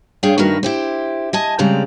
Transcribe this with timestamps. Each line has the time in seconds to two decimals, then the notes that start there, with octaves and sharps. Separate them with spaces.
0.23 G2 G#4 C#5 F5 G5
0.38 G2 D#3 A3 F#4 A#4 B4
0.63 E4 G4 C5
1.33 D#5 G#5 A5
1.59 C#3 G3 G#3 C4 A#5